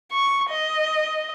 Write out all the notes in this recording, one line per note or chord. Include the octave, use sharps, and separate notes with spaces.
C#6
D#5